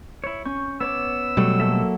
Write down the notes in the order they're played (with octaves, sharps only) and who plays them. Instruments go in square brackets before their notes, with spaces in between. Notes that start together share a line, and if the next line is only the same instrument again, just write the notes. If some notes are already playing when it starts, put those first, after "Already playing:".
[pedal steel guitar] E4 C#5
[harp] C#4 [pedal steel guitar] C#6 G6
[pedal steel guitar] B3 C#5 D6 [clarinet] E6
[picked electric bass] B2 G3 A3 [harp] F#3
[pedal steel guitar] A#3 A4 E5